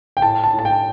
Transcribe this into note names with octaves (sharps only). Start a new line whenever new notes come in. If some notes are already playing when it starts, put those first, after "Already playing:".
G5
A2 A5
A5
A2
A5
G5